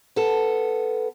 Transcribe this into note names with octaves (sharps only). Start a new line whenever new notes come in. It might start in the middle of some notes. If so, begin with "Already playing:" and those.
B3 A4